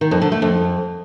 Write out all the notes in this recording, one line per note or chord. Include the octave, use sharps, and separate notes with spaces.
D#3
F2
D3
A3
F2